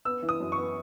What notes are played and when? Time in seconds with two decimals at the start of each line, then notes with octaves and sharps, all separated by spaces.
0.05 B3 E6
0.22 E3
0.29 D#6
0.40 F#2
0.52 C#6
0.58 B3